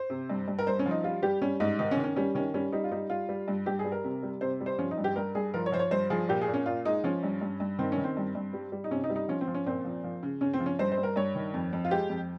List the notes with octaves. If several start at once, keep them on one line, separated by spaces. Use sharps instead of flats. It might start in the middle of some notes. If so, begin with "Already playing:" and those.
Already playing: C5
C3
G2
G2
A#4
G2 C5
C#4
F3
D#4
G3 F4
G3 G4
G3 C#4
G#2 D#4
D#3 D#4
C#4
D#3
C#4
G3 C#4
D#3 C#4
G3 C#4
G3 D#4
F4
G3 D#4
G3 F4
G3
G2
G2 G4
G#4
G3
A#4
C3
G3
C3 C5
G3
C5
F3 C#4
D#4
G2
G4
G2 A#4
G2 G#4
F3 A#4
C#5
F3 C5
C#5
G2 C5
F3 G#4
A#2 G4
G#4
A#2
C#4
A#2 F4
G#3 D#4
F3 C#4
G2
G2
G2
D#3 C4
C#4
D#3
C4
G2
G2
G3
G3
D#4
C3 C#4
D#4
G3
D#4
F3 C#4
C4
F3
C#4
A#2 C4
F3
F3
C#3
C#3 C#4
C4
F3
C#4
G2 C5
C5
G2
A#4
G2 C#5
D#3
F2
F2
F4
G#3 G4
F2